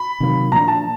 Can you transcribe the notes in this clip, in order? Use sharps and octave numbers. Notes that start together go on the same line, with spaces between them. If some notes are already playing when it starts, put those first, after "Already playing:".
Already playing: B5
C3 D#3 F#3 A#3
A#2 F3 A#3 D4 A#5
A5